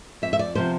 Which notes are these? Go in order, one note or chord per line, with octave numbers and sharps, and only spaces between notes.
F2 E5
E5
D5
C3 F3 B3 C5